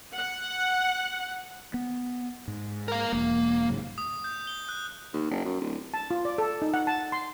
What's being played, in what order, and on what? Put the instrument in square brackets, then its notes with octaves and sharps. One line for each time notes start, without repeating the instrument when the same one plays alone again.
[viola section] F#5
[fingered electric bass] B3
G#2
[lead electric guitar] A#4 F5
[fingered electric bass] E1 [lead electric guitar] A#3
[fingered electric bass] G#2 C#3 F#3
[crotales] D#6
G6
G7
F#6
[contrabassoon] D#2
F#1
F#2
D1
[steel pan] A5
F4
D5
A4
D#4
F#5
A5
C6